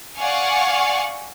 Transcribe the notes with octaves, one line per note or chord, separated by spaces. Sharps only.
D5 F5 F#5 G#5 C#6